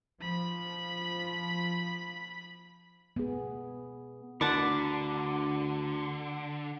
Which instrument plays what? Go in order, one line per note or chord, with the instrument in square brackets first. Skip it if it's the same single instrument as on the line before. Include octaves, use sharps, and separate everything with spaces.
[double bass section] F3 [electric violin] B5
[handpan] B3 G#4
[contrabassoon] D2 [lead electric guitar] D3 [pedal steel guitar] A#4 D5 B5 [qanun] F#5 A5 C#6